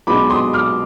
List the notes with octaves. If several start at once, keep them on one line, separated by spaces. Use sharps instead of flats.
B1 B2 G#3 B3 D4 B5 D6
C6 D#6
D6 F6